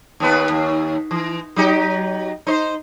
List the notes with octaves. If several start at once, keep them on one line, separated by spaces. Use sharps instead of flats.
D#2 B3 B4
D#2
E3
F#3 D#4 G4
D#4 C5